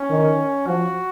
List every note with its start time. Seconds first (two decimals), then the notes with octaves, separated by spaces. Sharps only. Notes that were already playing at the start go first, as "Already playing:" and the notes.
Already playing: C#4
0.10 D#3
0.67 F3 F#4